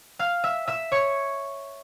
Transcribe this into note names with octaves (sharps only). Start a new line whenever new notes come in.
F5 F6
E5 E6
E5 E6
C#5 C#6